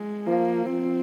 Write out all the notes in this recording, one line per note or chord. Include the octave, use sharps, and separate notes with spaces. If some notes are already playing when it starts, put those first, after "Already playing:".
Already playing: G#3
F3 A#3
F3 C4